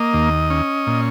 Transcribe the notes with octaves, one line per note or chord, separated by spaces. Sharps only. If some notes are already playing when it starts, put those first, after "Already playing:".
Already playing: A#3 D#5
D#2
C#4
A#2